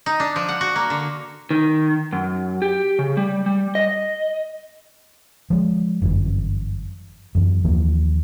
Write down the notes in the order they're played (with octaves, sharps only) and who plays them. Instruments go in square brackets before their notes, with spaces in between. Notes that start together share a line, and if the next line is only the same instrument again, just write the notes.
[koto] D#4
D4
F3
F#5
F#4
A#3
D3
[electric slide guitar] D#3
F#2
G4
C#3
G3
G3
D#5
[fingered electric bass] F3 G#3
G1 F#2 C3 E3
F#2 E3
D#2 E3 F3 A#3